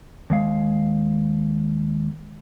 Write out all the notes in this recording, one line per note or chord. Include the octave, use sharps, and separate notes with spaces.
D#2 G#3 F5